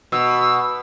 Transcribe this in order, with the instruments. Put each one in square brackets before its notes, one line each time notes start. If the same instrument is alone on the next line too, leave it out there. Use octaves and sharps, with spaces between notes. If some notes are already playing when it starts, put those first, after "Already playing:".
[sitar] B2 [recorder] E6